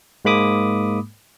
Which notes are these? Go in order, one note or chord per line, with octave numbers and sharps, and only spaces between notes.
G#2 G#3 A#3 B5 D6 D#6